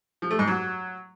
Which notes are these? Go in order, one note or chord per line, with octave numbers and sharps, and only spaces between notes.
F3
A3
G#2
F#3